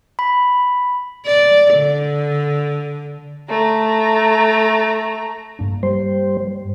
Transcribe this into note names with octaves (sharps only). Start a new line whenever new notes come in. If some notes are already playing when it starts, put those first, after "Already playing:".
B5
D5
D3
A3 A#5
G2 A#3 D4
G3 C5